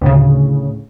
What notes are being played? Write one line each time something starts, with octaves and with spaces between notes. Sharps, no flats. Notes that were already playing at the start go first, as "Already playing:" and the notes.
D2 A2 C#3